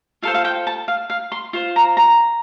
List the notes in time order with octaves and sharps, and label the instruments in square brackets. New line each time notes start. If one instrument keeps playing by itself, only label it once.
[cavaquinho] F4 A4 C5 F5
F5
G5
A5
F5
F5
C6
F4 C5
A#5
A#5